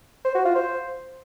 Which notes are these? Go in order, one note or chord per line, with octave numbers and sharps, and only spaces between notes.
C5
F#4
F4
C5